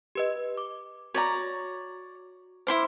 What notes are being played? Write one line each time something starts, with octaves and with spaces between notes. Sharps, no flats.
G4 B4 D#5
D6
F#4 C#5 D5 A#5
E4 C5 C6 D6